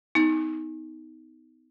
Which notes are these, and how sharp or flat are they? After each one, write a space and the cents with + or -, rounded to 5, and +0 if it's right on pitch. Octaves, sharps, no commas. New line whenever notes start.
B3 +35 D#4 +20